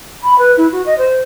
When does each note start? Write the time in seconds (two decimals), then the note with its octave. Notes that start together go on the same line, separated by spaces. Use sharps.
0.23 B5
0.38 B4
0.57 E4
0.72 F#4
0.85 D#5
0.98 C5